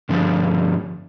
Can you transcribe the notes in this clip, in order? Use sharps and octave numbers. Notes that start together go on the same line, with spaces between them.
G2 D3 F3